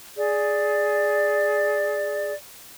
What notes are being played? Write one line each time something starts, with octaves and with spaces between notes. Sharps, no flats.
G#4 D5